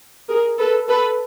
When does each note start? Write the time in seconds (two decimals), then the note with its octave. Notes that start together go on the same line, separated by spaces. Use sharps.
0.29 G#4 A#4
0.59 A4 B4
0.88 A4 B4